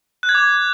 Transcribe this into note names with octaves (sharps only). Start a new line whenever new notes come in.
F#6
G#6
D6